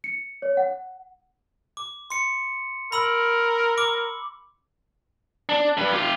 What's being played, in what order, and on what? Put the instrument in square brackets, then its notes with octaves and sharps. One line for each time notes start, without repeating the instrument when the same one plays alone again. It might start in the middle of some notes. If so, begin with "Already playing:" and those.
[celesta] C#7
C#5
F#5
[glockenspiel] D6
C6 C#7
[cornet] A#4 [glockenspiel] B5 E6 F#7
[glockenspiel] D6
[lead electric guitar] D4
G2 B4
F4 G4